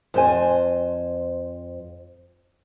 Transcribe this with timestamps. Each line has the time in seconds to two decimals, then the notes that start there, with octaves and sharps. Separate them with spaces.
0.14 F2 C5 G#5